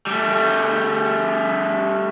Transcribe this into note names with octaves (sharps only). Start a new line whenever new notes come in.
G3 A3